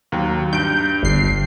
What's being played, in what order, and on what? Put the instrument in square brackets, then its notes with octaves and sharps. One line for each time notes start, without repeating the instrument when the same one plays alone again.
[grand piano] D#2 F#3
[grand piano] G2 D7 [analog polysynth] G6
[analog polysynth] G1 C7